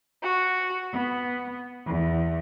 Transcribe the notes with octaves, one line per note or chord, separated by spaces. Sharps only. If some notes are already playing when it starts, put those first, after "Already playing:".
F#4
B3
E2